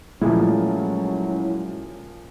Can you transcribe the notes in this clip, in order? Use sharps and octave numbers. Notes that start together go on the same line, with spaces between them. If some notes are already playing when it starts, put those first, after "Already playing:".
A#2 F3 F#3 G#3 A3 C#4 E4